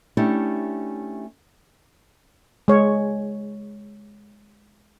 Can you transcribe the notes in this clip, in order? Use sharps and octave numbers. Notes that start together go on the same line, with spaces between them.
A3 C#4 D4 E4 G4
G#3 C#5